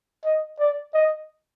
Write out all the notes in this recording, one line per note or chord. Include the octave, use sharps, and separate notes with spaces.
D#5
D5
D#5